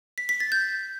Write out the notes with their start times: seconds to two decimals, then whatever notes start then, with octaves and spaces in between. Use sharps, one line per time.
0.18 B6
0.29 B6
0.40 A6
0.52 G6